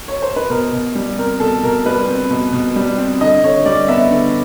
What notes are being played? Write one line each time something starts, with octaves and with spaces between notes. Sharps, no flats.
C#5
C5
B4
B2 A#4
B2
G3
C4 A#4
B2 A4
B2 A#4
G3 B4
C4
B2
B2
G3
C4
D3 D#5
D3 C#5
G3 D5
B3 E5
D3